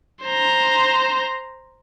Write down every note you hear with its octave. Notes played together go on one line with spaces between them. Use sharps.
C5 A#5